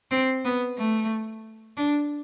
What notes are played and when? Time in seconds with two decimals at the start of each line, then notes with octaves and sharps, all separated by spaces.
0.11 C4
0.45 B3
0.78 A3
1.77 D4